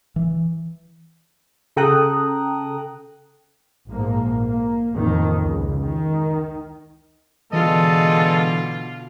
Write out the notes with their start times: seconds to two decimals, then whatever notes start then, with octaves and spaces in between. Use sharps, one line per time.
0.16 E3
1.76 C#3 A4 G5 A#5 D#6 F#6
3.88 A#1 G#2 F3 A#3
4.47 A#3
4.96 F2 A2 D#3 A#3
5.42 C#2
5.81 D#3
7.53 B2 D3 E3 G#3 D4 F4 A4 D#5